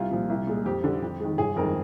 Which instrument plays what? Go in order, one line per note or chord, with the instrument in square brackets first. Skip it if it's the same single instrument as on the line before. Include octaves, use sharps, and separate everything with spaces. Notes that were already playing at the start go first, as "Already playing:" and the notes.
Already playing: [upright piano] C2 F4
A#2 F3
C2
A#2 G#3
F2 G4
D3 G3
F2
D#3 G#3
G1 G#4
F2 D#3 G#3 A#4